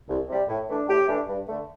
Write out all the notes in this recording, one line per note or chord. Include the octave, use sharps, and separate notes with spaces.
C2
C3 G3
A2
E3 A3 D4
A2 G4
E3 A3 D4
G2
D3 A3